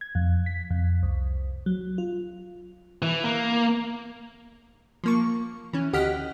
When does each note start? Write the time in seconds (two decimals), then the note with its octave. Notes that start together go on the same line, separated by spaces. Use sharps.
0.01 G#6
0.15 F2
0.46 B6
0.71 F2
1.03 C2
1.66 F#3
1.98 F4
3.02 E3
3.24 A#3
5.04 F3 A#3 C#6
5.73 E3 C#4
5.93 D2 G4 D#5 F#5 F6 B6